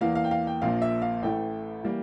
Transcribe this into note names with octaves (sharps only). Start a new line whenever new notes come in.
E2 E3 A#3 F5
F5
G5
F5
G5
A#1 A#2 F3 A#3 F5
E5
F5
A1 A2 E3 A3 G5
E3 G3 A#3